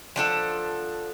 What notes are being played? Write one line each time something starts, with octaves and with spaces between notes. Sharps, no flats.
F3 D4 A4 F#5